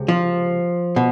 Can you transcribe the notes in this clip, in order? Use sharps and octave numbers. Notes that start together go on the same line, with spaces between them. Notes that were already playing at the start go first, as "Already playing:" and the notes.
Already playing: C#2 C3
F3
B2